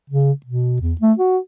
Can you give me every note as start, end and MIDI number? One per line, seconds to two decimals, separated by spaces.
0.10 0.32 49
0.46 0.78 47
0.81 0.94 40
1.01 1.13 57
1.19 1.38 66